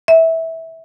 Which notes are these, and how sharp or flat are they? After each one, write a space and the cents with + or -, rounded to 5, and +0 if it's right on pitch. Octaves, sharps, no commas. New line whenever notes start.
E5 -15